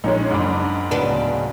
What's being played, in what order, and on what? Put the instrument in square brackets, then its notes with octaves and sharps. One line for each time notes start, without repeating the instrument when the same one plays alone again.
[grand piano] A#1 [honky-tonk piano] G#3 C#4 D#4
[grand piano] F#1 D4 [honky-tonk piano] G#2 B5
[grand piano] D1 [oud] C#3 B3 D4